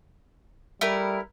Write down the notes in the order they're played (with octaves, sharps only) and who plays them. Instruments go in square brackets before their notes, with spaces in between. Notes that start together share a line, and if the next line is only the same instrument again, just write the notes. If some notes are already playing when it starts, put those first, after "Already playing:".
[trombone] G3 [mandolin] A3 E4 A#4